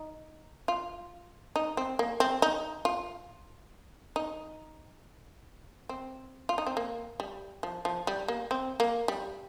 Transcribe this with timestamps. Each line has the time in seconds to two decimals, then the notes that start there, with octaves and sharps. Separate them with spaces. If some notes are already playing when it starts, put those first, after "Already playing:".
Already playing: D#4
0.68 F4
1.56 D#4
1.77 C4
1.99 A#3
2.20 C4
2.42 D#4
2.85 F4
4.16 D#4
5.89 C4
6.49 F4
6.58 D#4
6.67 C4
6.77 A#3
7.20 G3
7.63 F3
7.85 F3
8.07 G3
8.28 A#3
8.51 C4
8.80 A#3
9.08 G3